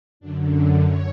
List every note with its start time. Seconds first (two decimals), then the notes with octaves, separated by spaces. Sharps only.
0.20 F#2 D3 D4
0.82 C#5